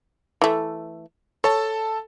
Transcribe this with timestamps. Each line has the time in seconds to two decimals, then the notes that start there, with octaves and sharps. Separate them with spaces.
0.41 E3 A3
1.44 A4 C#5 A5